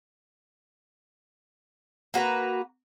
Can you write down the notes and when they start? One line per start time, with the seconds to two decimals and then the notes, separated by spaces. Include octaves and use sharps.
2.14 A#3 F#4 B4 A#5